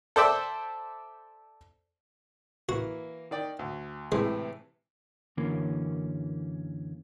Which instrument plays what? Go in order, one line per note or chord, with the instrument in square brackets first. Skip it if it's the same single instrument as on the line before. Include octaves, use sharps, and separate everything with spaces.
[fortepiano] A4 C5 D5 E5 G5
[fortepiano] E3 A#3 [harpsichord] F#4
[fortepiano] D#3 D5 G5
D2
[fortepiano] A2 C3 E3 [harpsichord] G#3
[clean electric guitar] F#2 D3 E3 F#3 A#3 C#4